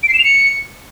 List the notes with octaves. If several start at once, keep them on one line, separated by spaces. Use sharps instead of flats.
D7
C7
E7
F7
C#7